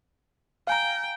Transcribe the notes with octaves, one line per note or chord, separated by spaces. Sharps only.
F5 G5 G#5 A#5